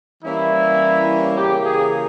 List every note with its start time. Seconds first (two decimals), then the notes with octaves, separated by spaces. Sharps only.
0.24 E3 G3 A#3 C#4 E4
1.37 C#3 E3 A#3 G4
1.65 G#4